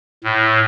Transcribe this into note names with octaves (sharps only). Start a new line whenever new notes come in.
A2